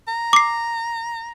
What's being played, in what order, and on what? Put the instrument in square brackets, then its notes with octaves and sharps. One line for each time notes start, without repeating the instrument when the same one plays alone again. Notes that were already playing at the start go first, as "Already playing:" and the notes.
[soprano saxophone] A#5
[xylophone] D6 C7